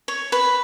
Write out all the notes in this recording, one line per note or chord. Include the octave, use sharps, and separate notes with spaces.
C#5
B4